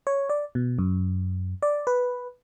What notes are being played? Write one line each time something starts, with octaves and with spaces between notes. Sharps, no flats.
C#5
D5
B2
F#2
D5
B4